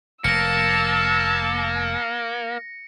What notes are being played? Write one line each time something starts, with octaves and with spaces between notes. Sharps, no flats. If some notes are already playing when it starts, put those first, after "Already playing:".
F1 A#3 A5 E6 A#6 C#7